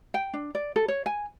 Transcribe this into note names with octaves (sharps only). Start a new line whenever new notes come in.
G5
D4
D5
A4
C#5
G#5